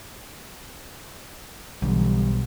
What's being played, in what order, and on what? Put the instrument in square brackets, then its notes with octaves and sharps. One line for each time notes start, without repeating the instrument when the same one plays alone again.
[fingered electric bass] B1 [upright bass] D3 E3 [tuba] G3